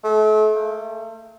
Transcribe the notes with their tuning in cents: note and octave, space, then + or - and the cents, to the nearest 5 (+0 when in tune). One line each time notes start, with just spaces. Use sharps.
A3 -40
A3 +40